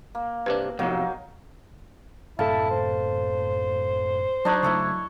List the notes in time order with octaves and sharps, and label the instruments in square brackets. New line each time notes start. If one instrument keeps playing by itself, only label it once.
[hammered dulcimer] A#3
[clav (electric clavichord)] G2 C3 D4 [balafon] B4
[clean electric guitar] B1 F2 C3 [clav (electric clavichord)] A2 [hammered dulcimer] F#3 A#3 D#4
[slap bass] F#2 A2 C3 [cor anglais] E4 [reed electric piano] A4 F5 [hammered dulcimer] A5
[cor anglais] C5
[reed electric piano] F#3 F#6 [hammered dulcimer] D4 D#4 C#5
[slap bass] C#3 A3 [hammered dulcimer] E4 A4 C#5